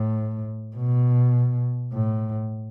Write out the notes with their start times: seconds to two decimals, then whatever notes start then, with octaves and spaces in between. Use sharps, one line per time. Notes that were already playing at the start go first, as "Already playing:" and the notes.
Already playing: A2
0.76 B2
1.93 A2